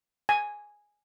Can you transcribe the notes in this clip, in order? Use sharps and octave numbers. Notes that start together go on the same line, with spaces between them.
G#5